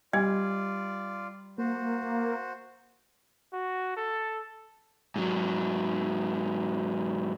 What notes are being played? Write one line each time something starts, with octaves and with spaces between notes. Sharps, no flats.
G3 F4 D5 D#5
A#3 F#4 C5
F#4
A4
G#2 F#3